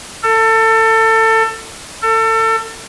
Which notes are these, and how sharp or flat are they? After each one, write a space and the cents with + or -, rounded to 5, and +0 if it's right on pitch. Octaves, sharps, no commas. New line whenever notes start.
A4 +25
A4 +30